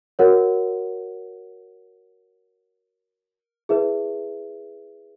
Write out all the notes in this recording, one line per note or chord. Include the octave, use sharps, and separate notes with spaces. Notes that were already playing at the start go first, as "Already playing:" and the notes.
F#4 A#4 C#5 F#5
E4 G#4 B4 E5